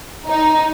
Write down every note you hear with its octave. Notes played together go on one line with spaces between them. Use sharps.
D#4